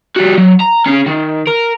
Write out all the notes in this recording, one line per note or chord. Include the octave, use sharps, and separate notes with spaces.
G3 F#4
F#3
A#5
C#4 G#4
D#3
A#4